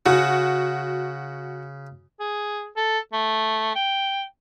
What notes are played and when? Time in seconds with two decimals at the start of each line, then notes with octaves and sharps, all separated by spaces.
0.06 C#3 F#4
2.20 G#4
2.77 A4
3.13 A3
3.75 G5